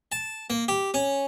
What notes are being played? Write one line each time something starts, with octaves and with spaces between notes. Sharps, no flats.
A5
A#3
G4
C#4